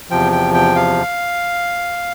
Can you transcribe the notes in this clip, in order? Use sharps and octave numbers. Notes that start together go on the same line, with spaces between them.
E2 C3 F3 G5
G5
G5
F5